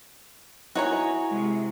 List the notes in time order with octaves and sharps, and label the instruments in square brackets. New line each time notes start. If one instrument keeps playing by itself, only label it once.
[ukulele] D#4 A#4 [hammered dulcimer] E4 [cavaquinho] F#4 C#5 G#5
[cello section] C3 G#3